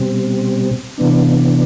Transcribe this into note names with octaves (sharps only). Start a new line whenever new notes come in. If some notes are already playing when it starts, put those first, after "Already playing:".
Already playing: B2 G3 C4
C3 E3 B3 D4